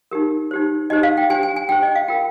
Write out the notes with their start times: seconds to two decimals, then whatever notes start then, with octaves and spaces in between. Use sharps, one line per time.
0.11 D#4 G4 A#4
0.51 D#4 G4 C5
0.90 D#4 G4 C5 D#5
1.03 F5
1.17 G5
1.30 D4 G4 C5 G#5
1.43 G#5
1.56 G#5
1.69 D4 G4 C5 G5
1.83 D#5
1.95 F5
2.08 F4 A#4 G5